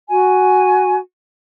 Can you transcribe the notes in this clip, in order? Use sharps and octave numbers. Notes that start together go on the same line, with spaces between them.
F#4 G#5